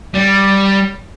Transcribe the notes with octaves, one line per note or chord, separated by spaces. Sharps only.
G3